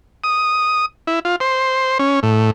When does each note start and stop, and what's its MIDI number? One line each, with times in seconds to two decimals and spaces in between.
0.24 0.86 87
1.07 1.19 64
1.25 1.36 65
1.40 1.98 72
1.99 2.20 61
2.23 2.51 45